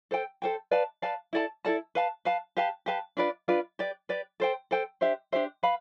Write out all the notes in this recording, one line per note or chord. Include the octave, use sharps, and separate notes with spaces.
A4 C5 G5
A4 C5 G5
B4 D5 F5 A5
B4 D5 F5 A5
E4 A4 D5 A5
E4 A4 D5 A5
B4 F5 A5
B4 F5 A5
G4 B4 F5 A5
G4 B4 F5 A5
D4 F4 B4 D5
D4 F4 B4 D5
G4 B4 D5
G4 B4 D5
A4 C5 G5
A4 C5 G5
D4 G4 C5 E5
D4 G4 C5 E5
B4 F5 B5